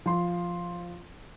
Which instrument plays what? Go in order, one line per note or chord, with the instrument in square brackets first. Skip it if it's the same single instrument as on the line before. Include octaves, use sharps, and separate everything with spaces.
[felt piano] F3 C6